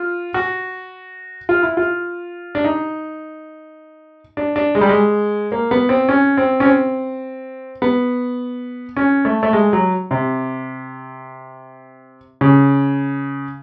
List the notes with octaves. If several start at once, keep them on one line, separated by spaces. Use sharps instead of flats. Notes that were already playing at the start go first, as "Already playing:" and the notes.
Already playing: F4
F#4
F4
E4
F4
D4
D#4
D4
D4
G#3
G3
G#3
A#3
B3
C4
C#4
C4
C#4
C4
B3
C#4
A3
A3
G#3
F#3
C3
C#3